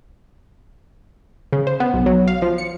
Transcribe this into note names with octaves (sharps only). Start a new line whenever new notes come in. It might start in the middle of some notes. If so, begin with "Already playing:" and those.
C#3
C5
B3
B1
F#3
F5
F3
C#7